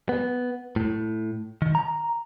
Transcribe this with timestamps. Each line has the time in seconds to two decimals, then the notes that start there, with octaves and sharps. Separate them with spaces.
0.09 B3
0.76 A2
1.62 D#3
1.75 A#5